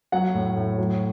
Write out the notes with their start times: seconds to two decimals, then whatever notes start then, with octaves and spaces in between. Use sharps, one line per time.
0.12 F#3 F#5
0.34 A2
0.56 A2
0.78 F#3